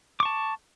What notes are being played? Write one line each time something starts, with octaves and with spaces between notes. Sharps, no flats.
A5 C#6 D6